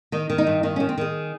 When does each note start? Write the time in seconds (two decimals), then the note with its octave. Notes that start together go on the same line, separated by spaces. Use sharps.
0.12 D#3 D#4
0.30 D#3
0.38 D#4
0.47 G2
0.63 D#3 D#4
0.76 D#3 C#4
0.89 C4
0.98 D#3 G#4